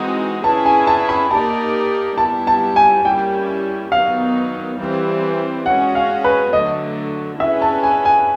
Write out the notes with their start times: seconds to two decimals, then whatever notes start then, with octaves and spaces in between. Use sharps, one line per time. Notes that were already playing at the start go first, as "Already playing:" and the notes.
Already playing: E3 G#3 C4 D#4 F#4
0.44 C#4 E4 G#4 B4 A5
0.65 G#5
0.87 A5
1.09 B5
1.31 A#3 D#4 G4 A#4 D5 A5
2.18 G3 B3 E4 G4 A5
2.47 A5
2.76 G#5
3.05 G3 A#3 C#4 E4 G4 G5
3.92 D#3 F#3 B3 D#4 F5
4.79 E3 G3 C4
5.66 G#3 C#4 F#4 F#5
5.95 F5
6.24 B4
6.53 D3 F#3 A3 D#5
7.40 C#4 E4 G#4 B4 E5
7.62 A5
7.83 G#5
8.05 G#5